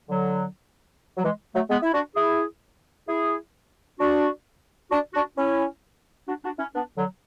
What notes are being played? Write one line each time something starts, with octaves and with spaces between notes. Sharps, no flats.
D3 F#3
F#3
E3 G#3
F#3 A3
G#3 B3
E4
D4 F#4
E4 G#4
E4 G#4
D4 F#4
D4 F#4
D4 F#4
C#4 E4
D4 F#4
D4 F#4
C#4 E4
B3 D4
D3 F#3